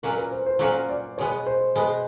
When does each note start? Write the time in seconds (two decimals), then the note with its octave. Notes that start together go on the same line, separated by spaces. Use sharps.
0.03 A#2 F#3 A#3 C#4 F#4 A#4
0.17 B4
0.31 C5
0.46 C5
0.59 A#2 F#3 A#3 C#4 F#4 C#5
0.89 D5
1.18 B2 G#3 B3 C#5
1.46 C5
1.75 B2 G#3 B3